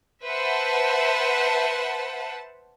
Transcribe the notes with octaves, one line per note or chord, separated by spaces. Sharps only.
B4 C5 E5 F#5 A5